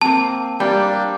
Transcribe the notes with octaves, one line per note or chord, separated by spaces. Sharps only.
A#3 C4 A5
G3 A#3 D4 G5